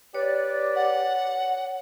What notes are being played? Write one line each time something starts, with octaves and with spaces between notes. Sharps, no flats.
G4 B4 C#5 D5
F#5